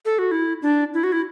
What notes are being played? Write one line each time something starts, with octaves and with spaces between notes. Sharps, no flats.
A4
F#4
E4
D4
E4
F#4
E4